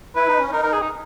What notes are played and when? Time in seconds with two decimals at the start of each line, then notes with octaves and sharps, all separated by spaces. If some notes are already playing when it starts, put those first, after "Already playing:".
0.15 E4 B4
0.28 D#4
0.39 C#4
0.51 D#4 A#4
0.63 A#4
0.72 G#4
0.82 D#4